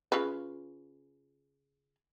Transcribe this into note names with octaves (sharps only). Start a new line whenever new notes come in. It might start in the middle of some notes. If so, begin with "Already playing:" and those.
C#3 F4 B4